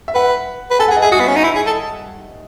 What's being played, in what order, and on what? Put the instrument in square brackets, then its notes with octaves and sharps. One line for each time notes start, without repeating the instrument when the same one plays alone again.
[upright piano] E5
[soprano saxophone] B4 [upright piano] F#5
[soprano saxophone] B4
[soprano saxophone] A4 [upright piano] G#5
[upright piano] F#5
[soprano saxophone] G#4
[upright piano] D#5
[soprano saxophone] G#4 [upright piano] E5
[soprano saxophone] F#4 [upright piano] D#6
[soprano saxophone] B3
C#4
D#4
E4
G#4
A4